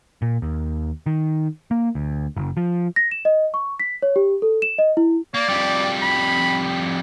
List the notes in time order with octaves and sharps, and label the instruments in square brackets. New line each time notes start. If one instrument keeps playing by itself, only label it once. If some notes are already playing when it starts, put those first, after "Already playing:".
[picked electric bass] A#2
D#2
D#3
A#3
D2
F#1
F3
[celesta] A#6
E7
D#5
C#6
B6
C#5
G4
A4
E7
D#5
E4
[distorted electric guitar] A#3 [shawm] D5
[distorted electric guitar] F2 G3
[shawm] B5